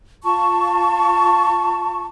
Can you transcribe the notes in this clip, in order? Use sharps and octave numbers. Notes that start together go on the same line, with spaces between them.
F4 A5 C#6